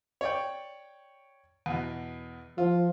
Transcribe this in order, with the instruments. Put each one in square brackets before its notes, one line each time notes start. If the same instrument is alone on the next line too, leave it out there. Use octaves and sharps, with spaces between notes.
[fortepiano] C#5 D5 G5
E2 B2
[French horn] F3 [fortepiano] F4